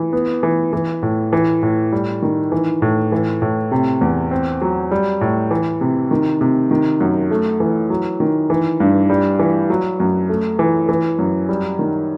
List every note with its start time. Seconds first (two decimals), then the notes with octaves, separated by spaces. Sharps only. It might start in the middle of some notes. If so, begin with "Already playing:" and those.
Already playing: E3
0.13 B3
0.43 E3
0.73 E3
1.03 A2
1.33 E3
1.63 A2
1.92 G3
2.22 D#3
2.52 E3
2.82 A2
3.12 E3
3.42 A2
3.72 C3
4.01 E2
4.31 C4
4.62 F#3
4.91 G3
5.21 A2
5.51 E3
5.81 C3
6.11 D#3
6.41 C3
6.71 D#3
7.00 F#2
7.31 A3
7.60 E3
7.90 F#3
8.20 D#3
8.50 E3
8.80 G2
9.10 G3
9.39 E3
9.70 F#3
10.00 F#2
10.29 A3
10.59 E3
10.89 E3
11.19 F#2
11.49 G3
11.79 D#3